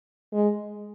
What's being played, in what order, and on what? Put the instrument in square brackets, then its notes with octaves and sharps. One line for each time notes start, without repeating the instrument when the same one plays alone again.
[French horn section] G#3